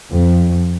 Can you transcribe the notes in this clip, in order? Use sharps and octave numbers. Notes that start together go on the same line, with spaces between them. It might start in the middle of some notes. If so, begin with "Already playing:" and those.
F2